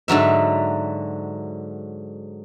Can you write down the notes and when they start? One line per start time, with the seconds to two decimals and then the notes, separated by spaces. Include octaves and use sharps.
0.08 G#2 D3 F#3 E5